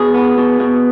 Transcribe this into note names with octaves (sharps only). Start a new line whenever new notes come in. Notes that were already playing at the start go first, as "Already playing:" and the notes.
Already playing: B2 G#4
B3
B2
B2